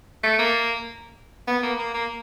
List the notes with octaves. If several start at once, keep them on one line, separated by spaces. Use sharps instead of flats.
A3
A#3
B3
A#3
A#3
A#3